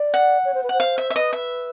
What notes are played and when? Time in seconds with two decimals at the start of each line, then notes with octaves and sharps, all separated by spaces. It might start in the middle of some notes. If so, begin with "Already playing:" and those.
Already playing: D5
0.14 F#5
0.45 C#5
0.54 C5
0.63 B4
0.69 C5 F#5
0.80 F5
0.98 E5
1.10 E5
1.16 B4 D#5
1.33 E5